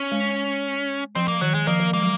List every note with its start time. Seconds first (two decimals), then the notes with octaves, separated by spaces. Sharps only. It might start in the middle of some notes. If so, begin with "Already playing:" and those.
Already playing: C#4
0.12 G#3
1.15 F3 C4
1.28 A#3
1.41 D#3 F#3
1.54 G#3
1.67 F3 A#3
1.80 F3
1.93 G#3 A#3
2.02 F#3